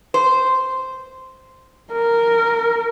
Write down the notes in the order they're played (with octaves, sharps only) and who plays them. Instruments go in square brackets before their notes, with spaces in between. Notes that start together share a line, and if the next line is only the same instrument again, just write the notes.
[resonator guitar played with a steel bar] C5
[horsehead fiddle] A#4